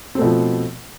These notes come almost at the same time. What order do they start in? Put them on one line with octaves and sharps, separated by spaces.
C4 A3 B2 F3